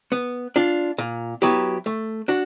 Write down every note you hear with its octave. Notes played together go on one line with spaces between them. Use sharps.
B3
D4 F4
A#2
F#3 B3 E4 G4
A3
D4 F#4